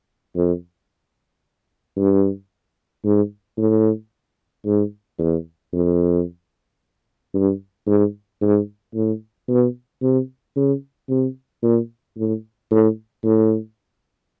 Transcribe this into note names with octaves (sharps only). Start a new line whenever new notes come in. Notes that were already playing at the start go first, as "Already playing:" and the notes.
F2
G2
G#2
A2
G#2
E2
F2
G2
G#2
G#2
A2
B2
C3
C#3
C3
A#2
A2
A2
A2